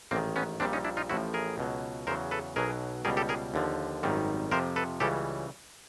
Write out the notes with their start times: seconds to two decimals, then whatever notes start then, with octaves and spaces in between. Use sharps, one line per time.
0.11 A1 G#2 D#3 A#3 C4
0.36 B3 C#4
0.60 A#1 A#2 G3 C4 D4
0.73 C#4 D#4
0.85 D4 E4
0.97 D#4 F4
1.09 A1 A2 F3 E4 F#4
1.34 G#4 A#4
1.58 C#2 B2 F#3
2.07 E2 C#3 F#3 A#4 C5
2.31 A4 B4
2.56 B1 B2 F#3 G#4 A#4
3.05 C#2 B2 G3 G#4 A#4
3.17 G4 A4
3.29 G#4 A#4
3.54 D#2 D3 F3
4.03 G#1 F#2 D#3 G3
4.51 F2 C3 F3 A#4 C5
4.76 A4 B4
5.00 C#2 C#3 E3 G3 G4 A4